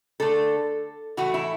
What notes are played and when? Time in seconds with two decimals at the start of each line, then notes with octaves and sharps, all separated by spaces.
0.20 D3 A3 A4
1.17 A2 E3 A3 F#4
1.34 E4